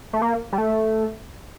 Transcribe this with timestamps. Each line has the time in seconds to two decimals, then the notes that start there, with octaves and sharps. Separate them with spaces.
0.13 A3
0.22 A#3
0.52 G3
0.58 A3